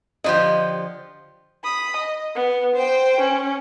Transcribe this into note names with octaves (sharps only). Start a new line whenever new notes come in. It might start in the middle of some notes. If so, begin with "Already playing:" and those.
D3 F3 G4 D#5
B5 D#6
D#5
B3
C5 G5
C#4